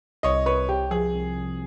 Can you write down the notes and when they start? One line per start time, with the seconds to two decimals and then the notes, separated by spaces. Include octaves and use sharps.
0.23 C2 C#5 D#5
0.46 C2 B4 C#5
0.69 C3 G4
0.91 F3 G#4
1.14 C2
1.36 C2